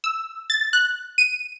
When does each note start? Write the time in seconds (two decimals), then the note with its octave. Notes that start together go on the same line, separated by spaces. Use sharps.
0.04 E6
0.50 A6
0.73 F#6
1.18 D#7